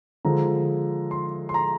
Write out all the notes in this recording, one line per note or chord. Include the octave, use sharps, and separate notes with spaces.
D3 F3 G#3 A#5
C6
C6
A#5